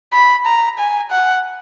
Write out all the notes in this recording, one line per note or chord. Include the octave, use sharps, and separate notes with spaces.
B5
A#5
G#5
F#5